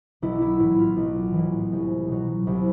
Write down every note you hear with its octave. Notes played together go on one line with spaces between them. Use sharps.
B1 E4
E4
A2 E3 E4
F4
B1
A2 E3
C2
B2 F#3
C2 E4